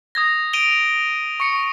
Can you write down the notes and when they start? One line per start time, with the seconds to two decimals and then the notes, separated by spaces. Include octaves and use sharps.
0.15 D#6 G#6 A#6
0.53 D7 D#7 F7 G7
1.40 C#6 C#7